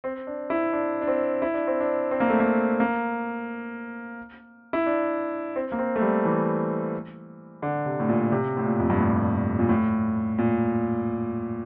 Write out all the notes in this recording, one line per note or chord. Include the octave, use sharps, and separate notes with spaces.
C4
D4
E4
D4
D4
C4
E4
D4
C4
D4
C4
A#3
A3
A#3
A#3
E4
D4
C4
A#3
C4
A3
G3
E3
D3
C3
A2
A#2
C3
A2
A#2
F2
G2
A2
A#2
A2
A#2